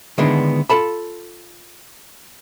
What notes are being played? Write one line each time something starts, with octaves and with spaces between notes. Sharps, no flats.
D3 D#3 G#3 B3 D4 E4
F4 A4 A5 B5